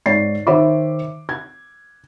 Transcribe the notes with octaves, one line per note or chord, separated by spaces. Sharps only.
G#2 C#5 D5 A6 C7
D#3 C5 C#5 E5 B5 D6
G#6